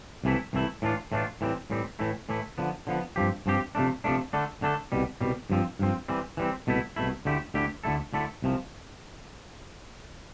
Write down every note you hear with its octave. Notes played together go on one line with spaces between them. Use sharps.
C2 C3 E3 A3 E4
C2 C3 E3 A3 E4
A2 E3 A3 D4 F4
A2 E3 A3 D4 F4
A2 E3 G3 C4
A2 E3 G3 C4
A2 E3 A3 E4
A2 E3 A3 E4
D3 F3 B3
D3 F3 B3
G2 F3 C4 G4
G2 F3 C4 G4
C3 F3 A3 D4
C3 F3 A3 D4
D3 A3 D4 A4
D3 A3 D4 A4
C2 B2 G3
C2 B2 G3
G2 F3 C4
G2 F3 C4
E3 G3 C4
E3 G3 C4
C2 B2 A3 E4
C2 B2 A3 E4
D2 D3 A3 E4 G4
D2 D3 A3 E4 G4
D2 D3 A3 E4 A4
D2 D3 A3 E4 A4
C2 C3 F3